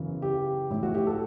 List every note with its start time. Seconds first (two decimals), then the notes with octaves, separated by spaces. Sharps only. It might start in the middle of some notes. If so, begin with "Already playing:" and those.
Already playing: F#2 C#3 E3 B3
0.22 G4
0.70 A2 E3 B3 E4
0.83 F#4
0.95 G4
1.07 A4